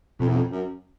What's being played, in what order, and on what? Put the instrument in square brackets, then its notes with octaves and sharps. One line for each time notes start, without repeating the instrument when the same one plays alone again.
[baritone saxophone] F2 [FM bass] B2
[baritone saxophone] E2
F2
F#2